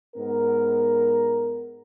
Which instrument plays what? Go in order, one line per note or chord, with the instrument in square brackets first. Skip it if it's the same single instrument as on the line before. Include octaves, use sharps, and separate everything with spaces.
[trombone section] G#2 B3 A#4